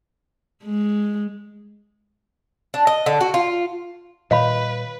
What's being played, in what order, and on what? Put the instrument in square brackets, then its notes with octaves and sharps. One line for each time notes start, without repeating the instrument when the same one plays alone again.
[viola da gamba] G#3
[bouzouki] D4
D#5
D3
F#4
F4
[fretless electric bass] A#2 D#3 G3 [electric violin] B4 [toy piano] C#5 F5 B5 [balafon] D#5